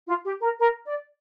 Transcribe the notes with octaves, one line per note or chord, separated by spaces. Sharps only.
F4
G4
A#4
A#4
D5